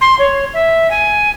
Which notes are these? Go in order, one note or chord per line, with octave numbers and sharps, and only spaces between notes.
C6
C#5
E5
G#5